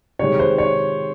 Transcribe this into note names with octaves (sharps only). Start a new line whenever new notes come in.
C3 D#3 G#3 C#5
C5
C#5